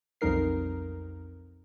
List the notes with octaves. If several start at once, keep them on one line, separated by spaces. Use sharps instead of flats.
B1 F2 G3 D#4 A#4 C7